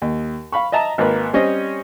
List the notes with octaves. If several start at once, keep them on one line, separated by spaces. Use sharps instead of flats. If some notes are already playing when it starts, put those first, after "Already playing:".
D#2
F5 B5 C#6
D#5 E5 A5 A#5
G#1 A#3 B4
G3 C4 C#4 C5 D#5